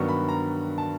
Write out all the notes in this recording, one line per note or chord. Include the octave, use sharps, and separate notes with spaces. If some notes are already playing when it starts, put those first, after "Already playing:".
Already playing: G2 D#3 F#3 B3 C#6
B5
A#5
A5